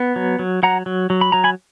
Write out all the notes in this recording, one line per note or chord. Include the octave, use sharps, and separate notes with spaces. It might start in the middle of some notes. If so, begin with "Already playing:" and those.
Already playing: B3
F#3
F#3
F#3 F#5 A#5
F#3
F#3
B5
F#3 A#5
G#5 B5